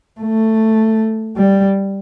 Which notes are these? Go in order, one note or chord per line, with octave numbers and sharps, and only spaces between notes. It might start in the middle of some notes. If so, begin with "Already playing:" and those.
A3
G3